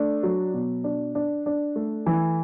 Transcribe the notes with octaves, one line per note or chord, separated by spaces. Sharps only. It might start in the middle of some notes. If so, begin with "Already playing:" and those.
Already playing: A3 D4
F#3
B2
D4
D4
D4
A3
E3